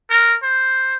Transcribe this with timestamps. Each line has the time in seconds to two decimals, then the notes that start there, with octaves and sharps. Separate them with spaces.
0.10 A#4
0.43 C5